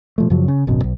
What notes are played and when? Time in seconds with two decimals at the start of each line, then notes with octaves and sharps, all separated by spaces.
0.18 B2 F3 A3
0.30 F#2 C#3 F3 F#3
0.48 C#3
0.67 D1 G#1 F#2 B2
0.84 B1